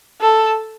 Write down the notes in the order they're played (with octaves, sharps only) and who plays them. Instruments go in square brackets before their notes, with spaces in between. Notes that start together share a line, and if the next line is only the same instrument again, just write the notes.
[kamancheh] A4